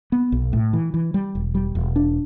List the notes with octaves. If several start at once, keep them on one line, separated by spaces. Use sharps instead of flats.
B3
B1
A2
E3
E3
G3
E1
G3
E1
D4